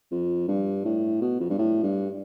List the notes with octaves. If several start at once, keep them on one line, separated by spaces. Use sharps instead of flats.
F2
G2
A2
B2
F2
G2
A2
G2